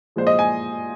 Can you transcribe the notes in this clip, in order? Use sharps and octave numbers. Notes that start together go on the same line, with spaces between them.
A#2 F3 G#3 C5
D#5
G#5